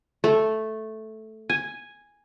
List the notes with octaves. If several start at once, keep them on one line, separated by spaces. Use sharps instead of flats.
A3
G#5